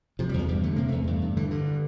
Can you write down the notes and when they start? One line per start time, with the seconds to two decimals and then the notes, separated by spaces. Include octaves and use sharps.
0.19 C3 F3
0.29 G3
0.34 E2 F3
0.49 G2 G3
0.63 D3 A3
0.76 C3 A#3
0.89 E2 A3
1.07 G2
1.22 G2
1.37 D3 E3
1.51 G2 D3